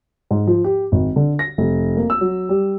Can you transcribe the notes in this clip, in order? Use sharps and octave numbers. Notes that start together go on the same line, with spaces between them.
G#2
F3
G4
G#1
D3
A#6
F1
A#3
E6
F#3
G3